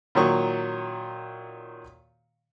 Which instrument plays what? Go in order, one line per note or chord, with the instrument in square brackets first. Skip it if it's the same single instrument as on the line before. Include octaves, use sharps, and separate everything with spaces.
[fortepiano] A#2 D#3 F#3 C#6